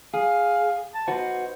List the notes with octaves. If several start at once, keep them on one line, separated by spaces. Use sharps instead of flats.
G#4 F5
A5
D#4 F#4 B4 C5